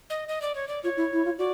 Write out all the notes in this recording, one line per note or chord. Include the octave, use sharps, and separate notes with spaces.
D#5
D#5
D5
C#5
D5
F4 C#5
E4
E4
F4
F#4 D5